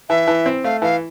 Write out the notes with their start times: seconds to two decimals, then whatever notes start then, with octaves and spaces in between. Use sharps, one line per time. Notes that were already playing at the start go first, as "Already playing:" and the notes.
0.09 E3 E5
0.28 E3
0.46 C4
0.64 A3 F5
0.82 E3 F5